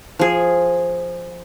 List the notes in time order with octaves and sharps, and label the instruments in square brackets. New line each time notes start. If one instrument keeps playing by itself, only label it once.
[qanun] F3 G#4